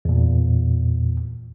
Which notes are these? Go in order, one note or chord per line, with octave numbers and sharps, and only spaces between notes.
E2 A#2